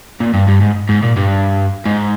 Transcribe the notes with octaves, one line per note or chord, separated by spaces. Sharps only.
A#2
G2
G2
G#2
G#2
A#2
G2
G#2